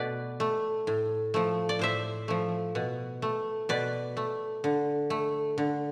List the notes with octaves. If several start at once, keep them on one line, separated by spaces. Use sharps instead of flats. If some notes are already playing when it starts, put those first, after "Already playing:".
Already playing: B2 A3 B4 D5
A3
A2
F3 A3
D5
A2 C5 E5
F3 A3
B2
A3
B2 B4 D5
A3
D3
A3
D3